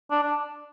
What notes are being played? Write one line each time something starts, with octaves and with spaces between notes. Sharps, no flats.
D4
D4